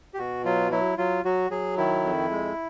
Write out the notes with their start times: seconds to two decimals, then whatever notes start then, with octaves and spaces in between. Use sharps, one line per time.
0.14 G4
0.18 B2 F#4
0.45 F#3 F4
0.71 F#3 E4
0.98 F#3 F4
1.24 F#3 F#4
1.51 F#3 G#4
1.77 D#3 E4
2.04 F2
2.31 G#3